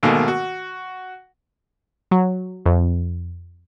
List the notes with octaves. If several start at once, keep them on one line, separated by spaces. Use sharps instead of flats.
G#2 B2 D#3 A3 A#3
F#4
F#3
F2